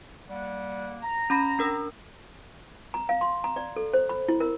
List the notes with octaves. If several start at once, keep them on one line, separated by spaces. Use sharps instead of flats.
G3 A#3 F#5
A#5
C#4 B5 A#6
D4 A#4 E6
A#5
F5
C6
A#5
D5
A4
C5
B5
E4
A#4